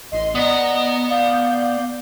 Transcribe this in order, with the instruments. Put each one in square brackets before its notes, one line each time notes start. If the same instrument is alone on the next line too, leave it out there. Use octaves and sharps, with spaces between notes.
[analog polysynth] A1 C6 [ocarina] D#5
[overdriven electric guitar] B3 F#5 [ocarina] D5 [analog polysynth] D#5 A#5
[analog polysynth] D5 G6 [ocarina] F5